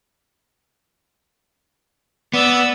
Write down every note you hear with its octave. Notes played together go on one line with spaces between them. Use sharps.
B3 D5 E6